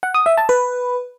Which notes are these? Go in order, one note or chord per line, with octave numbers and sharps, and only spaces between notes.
F#5
D#6
E5
A5
B4